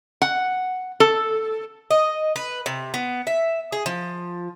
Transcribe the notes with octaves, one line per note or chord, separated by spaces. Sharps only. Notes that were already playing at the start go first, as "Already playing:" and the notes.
F#5
A4
D#5
B4
C3
B3
E5
G#4
F3